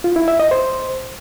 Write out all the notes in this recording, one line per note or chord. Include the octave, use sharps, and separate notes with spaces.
F4
E4
E5
D#5
C5